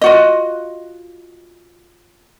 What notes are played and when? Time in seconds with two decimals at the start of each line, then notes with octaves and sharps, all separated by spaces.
0.01 F4 F#4 D#5